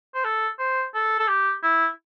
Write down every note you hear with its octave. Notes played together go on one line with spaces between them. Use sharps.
C5
A4
C5
A4
A4
G4
E4